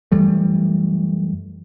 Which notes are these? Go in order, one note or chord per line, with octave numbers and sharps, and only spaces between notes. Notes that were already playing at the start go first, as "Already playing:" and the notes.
F#2 E3 G3 A3